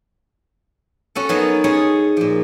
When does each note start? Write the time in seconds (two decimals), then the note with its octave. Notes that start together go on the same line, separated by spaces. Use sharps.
1.15 C#4 F#4 A4
1.29 F#3 B3 D#4 A#4 A5
1.64 C#4 G#4 C#5 A5 C6
2.17 A#2 F3